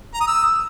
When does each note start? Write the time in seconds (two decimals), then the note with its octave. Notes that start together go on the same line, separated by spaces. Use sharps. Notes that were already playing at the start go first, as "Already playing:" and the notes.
0.14 A#5
0.21 D#6
0.27 E6